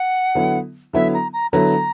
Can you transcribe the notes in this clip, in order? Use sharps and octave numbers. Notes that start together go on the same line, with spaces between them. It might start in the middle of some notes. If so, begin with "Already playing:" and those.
Already playing: F#5
D3 F#3 B3 E4
D3 F#3 B3 E4 E5
A#5
A#5
D3 F#3 B3 E4 A#5